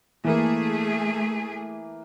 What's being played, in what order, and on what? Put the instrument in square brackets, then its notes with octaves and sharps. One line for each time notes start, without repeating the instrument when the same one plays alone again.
[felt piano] E3 A#3 [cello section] A3 G#4